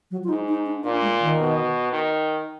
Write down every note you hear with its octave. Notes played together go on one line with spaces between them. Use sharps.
F#3
F4
G#2 D#4
D#4
D4
A#2 D4
G#3
D#3
B2
D#3